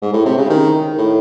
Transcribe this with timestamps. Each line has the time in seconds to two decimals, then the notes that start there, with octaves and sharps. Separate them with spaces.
0.02 G#2
0.13 A2
0.26 C3
0.38 C#3
0.50 D#3
0.98 A2